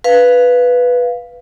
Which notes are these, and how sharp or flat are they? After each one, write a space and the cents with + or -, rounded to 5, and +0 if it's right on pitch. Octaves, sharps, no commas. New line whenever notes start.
B4 +0 F5 +0